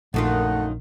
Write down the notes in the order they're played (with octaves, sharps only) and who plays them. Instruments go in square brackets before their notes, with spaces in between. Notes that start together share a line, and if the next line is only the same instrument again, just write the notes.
[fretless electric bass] A#1 [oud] F#2 D#3 F4 [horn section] A3 F#5